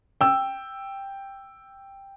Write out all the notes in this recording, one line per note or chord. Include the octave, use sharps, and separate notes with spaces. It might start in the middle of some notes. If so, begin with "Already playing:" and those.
G5 E6